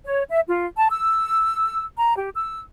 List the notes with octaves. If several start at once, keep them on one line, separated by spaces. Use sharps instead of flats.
C#5
E5
F4
A5
E6
A#5
G4
E6